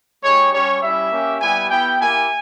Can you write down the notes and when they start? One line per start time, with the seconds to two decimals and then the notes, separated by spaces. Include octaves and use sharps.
0.23 G#3 D#4 G4 C#5
0.52 G3 C#4 G4 C#5
0.82 G3 C#4 E4 E5
1.12 A#3 C#4 G4
1.41 G3 B3 E4 G4 G#5
1.70 B3 E4 G4 G5
2.00 A#3 E4 G4 G#5